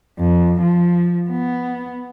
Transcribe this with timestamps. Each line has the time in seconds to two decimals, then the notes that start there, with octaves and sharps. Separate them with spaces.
0.19 F2
0.62 F3
1.30 B3